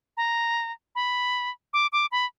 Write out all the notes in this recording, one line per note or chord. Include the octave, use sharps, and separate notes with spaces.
A#5
B5
D6
D6
B5